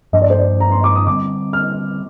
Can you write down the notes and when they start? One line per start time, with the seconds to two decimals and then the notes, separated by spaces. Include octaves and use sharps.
0.13 G2 F3 A#3 D4 D#5
0.22 D5
0.30 C5
0.38 D5
0.60 A#5
0.72 C6
0.84 D6
0.96 D#6
1.07 D3 G3 C4 D6
1.53 F6